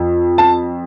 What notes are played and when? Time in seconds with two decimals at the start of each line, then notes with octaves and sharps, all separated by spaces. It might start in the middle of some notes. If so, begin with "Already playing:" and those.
Already playing: F2
0.38 A5